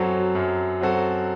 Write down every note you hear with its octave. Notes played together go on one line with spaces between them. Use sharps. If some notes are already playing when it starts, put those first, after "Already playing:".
Already playing: F#2 F#3 C4 F#4 A4
F#2
F#3 C4 F#4 A4